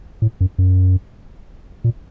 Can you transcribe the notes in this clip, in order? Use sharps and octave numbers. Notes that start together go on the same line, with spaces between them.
A2
F#2
F#2
A#2